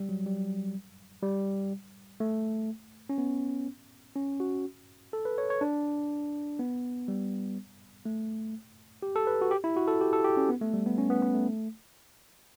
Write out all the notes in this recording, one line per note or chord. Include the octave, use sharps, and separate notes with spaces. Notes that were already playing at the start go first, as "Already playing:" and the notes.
Already playing: G3
F#3
G3
G3
A3
C#4
B3
C#4
F#4
A4
B4
C#5
C#5
D4
B3
G3
A3
G4
A4
B4
F#4
G4
E4
F#4
A4
G4
A4
G4
C#4
B3
A3
G3
B3
C#4
B3
B3
A3